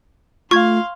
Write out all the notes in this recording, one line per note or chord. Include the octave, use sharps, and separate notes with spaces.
A3 F4 F5 C6 C#6 G#6